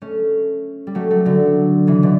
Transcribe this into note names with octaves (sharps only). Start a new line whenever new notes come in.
A3 C#4
G3
F#3 A3
F#3 A3
D3 F#3
C#3 E3
B2 D3